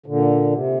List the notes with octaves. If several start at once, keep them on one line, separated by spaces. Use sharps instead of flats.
A#2 D3
C3